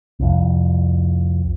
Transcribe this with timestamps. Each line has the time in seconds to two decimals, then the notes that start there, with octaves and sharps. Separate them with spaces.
0.20 C2 F2